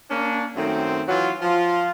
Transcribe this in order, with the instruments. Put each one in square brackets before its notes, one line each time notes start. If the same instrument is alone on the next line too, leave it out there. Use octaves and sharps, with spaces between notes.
[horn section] A#3 C#4 D4
F#2 D#3 F#3 A3 C4
E3 F#3 F4
F3 F4